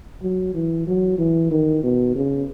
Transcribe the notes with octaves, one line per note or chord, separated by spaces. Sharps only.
F#3
E3
F#3
E3
D#3
B2
C#3